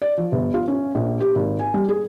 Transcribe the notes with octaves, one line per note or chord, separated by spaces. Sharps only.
D5
F3
G1
F4
C#4
A#1
G4
G#1
G#5
G3
G#4